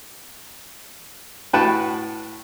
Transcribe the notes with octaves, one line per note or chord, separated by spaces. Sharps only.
A2 F#4 B4 F#5 G5 A5